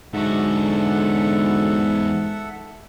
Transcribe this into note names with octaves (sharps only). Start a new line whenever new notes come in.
E2 G#2 D3 F#3 F#4 A4 E5 F#5